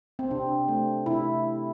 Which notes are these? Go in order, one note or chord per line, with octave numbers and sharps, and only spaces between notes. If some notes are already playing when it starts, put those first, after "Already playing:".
C4
C3 D4
A3
C3 E4